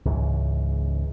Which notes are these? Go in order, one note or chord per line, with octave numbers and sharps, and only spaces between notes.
C#2 G#2 E3